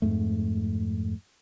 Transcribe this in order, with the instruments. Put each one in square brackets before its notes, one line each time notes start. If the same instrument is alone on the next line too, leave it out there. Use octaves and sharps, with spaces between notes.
[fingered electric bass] F2 G#2 A3